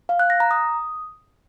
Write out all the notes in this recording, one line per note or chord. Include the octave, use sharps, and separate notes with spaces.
F5
F#6
A#6
A#5
D#6